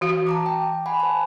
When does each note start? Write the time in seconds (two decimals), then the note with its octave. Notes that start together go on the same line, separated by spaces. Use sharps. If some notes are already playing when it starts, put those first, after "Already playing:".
0.01 E3 F#4 F5
0.27 A5 A#5 D6
0.46 G5
0.86 F#5 G#5 B5
1.00 C5 A5